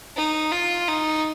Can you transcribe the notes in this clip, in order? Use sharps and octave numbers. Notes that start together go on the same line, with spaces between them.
D#4
F4
D#4